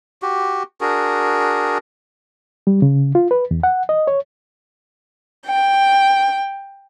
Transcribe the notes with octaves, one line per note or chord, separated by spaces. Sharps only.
F#4 G4
D4 F#4 G#4 A#4
G3
C#3
F4
B4
E2
F#5
D#5
C#5
G5